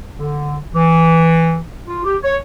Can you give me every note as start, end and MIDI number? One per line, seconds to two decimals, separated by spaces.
0.18 0.56 50
0.74 1.58 52
1.87 2.00 65
2.04 2.16 67
2.23 2.35 73